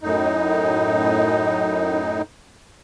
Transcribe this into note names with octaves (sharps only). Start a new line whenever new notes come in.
F#2 A2 D#4